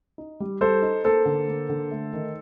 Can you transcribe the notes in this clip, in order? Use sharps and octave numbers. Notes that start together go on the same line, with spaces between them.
D#4
G3
G3 A4 C5
D#4
A#3 A4 C5
D3
A#3
D3
A3
D#3